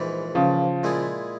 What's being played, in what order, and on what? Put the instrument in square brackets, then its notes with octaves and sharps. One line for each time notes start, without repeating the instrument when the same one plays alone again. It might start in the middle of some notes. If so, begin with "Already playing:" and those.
Already playing: [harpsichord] A#1 G#2 E3
[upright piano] C#3 F3
[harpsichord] A#2 G#3 E4 G#4